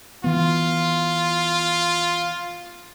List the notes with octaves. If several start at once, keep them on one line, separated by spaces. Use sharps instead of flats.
E3 B3 F4